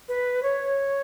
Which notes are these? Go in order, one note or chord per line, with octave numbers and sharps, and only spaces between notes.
B4
C#5